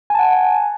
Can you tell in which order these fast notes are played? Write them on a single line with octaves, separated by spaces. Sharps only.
G#5 A5 F#5